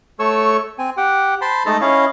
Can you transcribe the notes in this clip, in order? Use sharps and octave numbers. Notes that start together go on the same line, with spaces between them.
A3 A4 C#5 C#6 E6
C4 G#5
G4 F#5 G5
C5 A5 B5 C6
G#3 A3 D#4 A4 A5 A#5
C#4 E4 C#5 D#5 F5